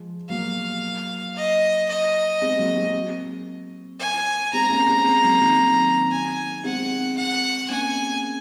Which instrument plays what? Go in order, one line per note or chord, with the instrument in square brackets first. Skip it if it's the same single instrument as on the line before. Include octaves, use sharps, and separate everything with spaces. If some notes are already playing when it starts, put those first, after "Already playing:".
Already playing: [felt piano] F3 G#3
[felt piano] F#3 A#3 [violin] F5
[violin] D#5
D#5
[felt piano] G#3 C4
F#3 A#3
G#3 C4
[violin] G#5
[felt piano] G#3 C4 [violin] A#5
[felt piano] A#3 C#4
G#3 C4
G#3 C4
F#3 A#3
D#3 F#3
D#3
[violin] G#5
[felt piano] G#3 C4 [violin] F#5
[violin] F#5
[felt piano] A#3 C#4 [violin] G#5